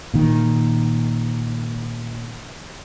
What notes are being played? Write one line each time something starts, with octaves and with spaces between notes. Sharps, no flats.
A#2 D#3